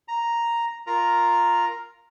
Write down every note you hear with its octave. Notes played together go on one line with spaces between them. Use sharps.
A#5
F4 A#4 A#5